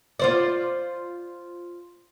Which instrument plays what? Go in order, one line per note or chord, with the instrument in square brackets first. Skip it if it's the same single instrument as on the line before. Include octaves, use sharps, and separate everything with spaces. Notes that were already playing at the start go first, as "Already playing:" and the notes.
[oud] F4 C5 D5